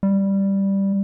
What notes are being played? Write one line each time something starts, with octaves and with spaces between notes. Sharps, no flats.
G3